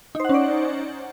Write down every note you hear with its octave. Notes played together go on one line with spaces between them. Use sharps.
C#4 D#4 C5 D5 F#5